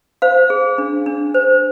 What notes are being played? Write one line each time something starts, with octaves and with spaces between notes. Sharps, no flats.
C5 F5
G#4
D4
D4
C5